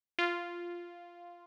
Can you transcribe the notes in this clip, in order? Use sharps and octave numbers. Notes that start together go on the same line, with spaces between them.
F4